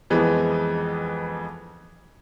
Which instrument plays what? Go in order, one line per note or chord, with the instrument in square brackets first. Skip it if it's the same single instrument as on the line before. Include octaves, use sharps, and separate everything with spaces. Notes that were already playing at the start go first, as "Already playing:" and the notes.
[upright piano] F2 E3 F3 G#3 B3